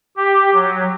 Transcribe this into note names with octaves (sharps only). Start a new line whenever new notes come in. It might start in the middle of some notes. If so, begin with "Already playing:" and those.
G4
F#3